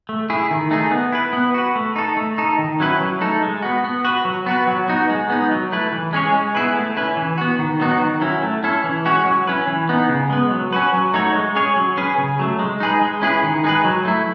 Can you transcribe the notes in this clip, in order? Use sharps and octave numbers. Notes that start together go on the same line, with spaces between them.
A3
E4 G#4
D#3
A3 D#4 G#4
B3
E4 B4
B3
F#4 B4
A3
D#4 A4
A3
D#4 A4
D#3
F#3 C#4 E4 B4
F#3
A3 D#4 A4
G#3
B3 F#4
B3
F#4 B4
F#3
B3 F#4 B4
F#3
B3 D#4 F#4
G#3
B3 D#4
F#3
A3 E4 B4
E3
G#3 C#4 G#4 C#5
G#3
B3 E4 G#4 B4
A3
C#4 E4 B4
E3
B3 F#4
D#3
F#3 B3 D#4 F#4
D#3
F#3 C#4 E4
A3
C#4 E4 A4
E3
G#3 C#4 F#4 C#5
F#3
C#4 E4 B4
E3
B3 D#4
C#3
G#3 B3
F#3
C#4 F#4 B4
F#3
A3 D#4 F#4 C#5
G#3
C#4 G#4 C#5
F#3
C#4 G#4 B4
C#3
F#3 A3
G#3
D#4 G#4 B4
G#3
C#4 E4 G#4 B4
D#3
G#3 D#4 G#4 B4
F#3
A3 E4